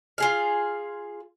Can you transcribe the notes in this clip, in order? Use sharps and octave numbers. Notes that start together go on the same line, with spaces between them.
F4 G#4 F5